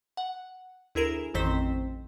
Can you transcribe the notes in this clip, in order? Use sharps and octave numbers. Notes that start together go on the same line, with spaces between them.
F#5
D2 E4 G#4 A#4 E7
A1 F2 D#3 C4 C5 B6